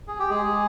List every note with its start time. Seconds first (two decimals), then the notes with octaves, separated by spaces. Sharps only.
0.08 G#4
0.20 G4
0.30 G#3 G#4